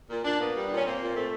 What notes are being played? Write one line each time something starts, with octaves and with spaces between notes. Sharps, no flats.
A#2
A#2 D4
A#3 B3
G3
A#2 D4
C#4
A#3 C4
A#2
A3 C4